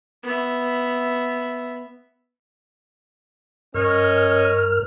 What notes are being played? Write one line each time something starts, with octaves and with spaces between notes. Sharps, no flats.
B3 E5
G2 C#4 A#4 C#5 D#5 F6